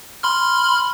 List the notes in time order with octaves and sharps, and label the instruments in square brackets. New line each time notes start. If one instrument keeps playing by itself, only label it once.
[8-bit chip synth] B5 C6 F6